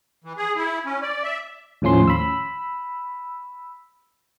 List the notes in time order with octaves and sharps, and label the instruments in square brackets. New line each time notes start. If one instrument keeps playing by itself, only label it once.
[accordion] E3
G#4
E4
C#4
D5
E5
[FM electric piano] D#2 A2 F3 C#4 C6
B5 E6